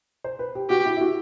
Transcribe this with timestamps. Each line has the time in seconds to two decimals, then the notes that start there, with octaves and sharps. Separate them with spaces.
0.24 C5
0.39 B4
0.55 G4
0.70 F#4 G4
0.86 E4
0.97 E4
1.01 F#4